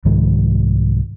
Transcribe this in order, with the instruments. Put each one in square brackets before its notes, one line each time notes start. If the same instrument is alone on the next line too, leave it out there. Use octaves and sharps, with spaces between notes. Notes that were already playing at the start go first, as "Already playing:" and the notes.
[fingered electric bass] C2 G#2 D#3 F3